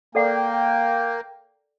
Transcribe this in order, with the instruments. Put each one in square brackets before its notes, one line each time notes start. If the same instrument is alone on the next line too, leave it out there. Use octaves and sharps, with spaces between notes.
[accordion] A#3 [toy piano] A4 D5 F#5 [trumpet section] G5